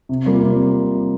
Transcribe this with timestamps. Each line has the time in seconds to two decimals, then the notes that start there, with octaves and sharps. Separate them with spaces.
0.09 C3
0.26 G3 A#3 F4
0.43 C3